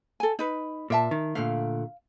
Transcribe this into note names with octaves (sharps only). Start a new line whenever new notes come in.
A4 G#5
D#4 B4
A#2 A#4 E5 A5
D#3
A#2 D3 A3 F5